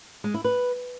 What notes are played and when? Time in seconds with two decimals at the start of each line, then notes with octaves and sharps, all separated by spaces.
0.24 G#3
0.34 E4
0.44 B4